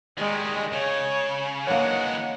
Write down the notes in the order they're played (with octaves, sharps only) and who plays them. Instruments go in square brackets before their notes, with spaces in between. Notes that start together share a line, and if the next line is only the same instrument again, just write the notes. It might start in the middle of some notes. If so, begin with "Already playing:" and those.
[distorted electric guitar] D#3 G3 [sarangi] G#3
[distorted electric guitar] C#3 [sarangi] C#5
[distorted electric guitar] E3 G#3 [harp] A#3 D4 C#5 [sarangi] F#5